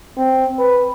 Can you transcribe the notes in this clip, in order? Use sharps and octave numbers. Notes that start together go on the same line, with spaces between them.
C4
B4